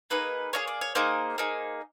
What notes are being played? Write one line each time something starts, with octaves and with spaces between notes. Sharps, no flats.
A#3 D#4 G#4 B4
A#3 D#4 G#4 C#5
D5
C#5
A#3 D#4 G#4 C5
A#3 D#4 G#4